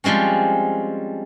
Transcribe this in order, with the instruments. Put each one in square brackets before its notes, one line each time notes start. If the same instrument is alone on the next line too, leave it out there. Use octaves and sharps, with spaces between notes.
[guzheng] F3 G3 G#3 C4 C#4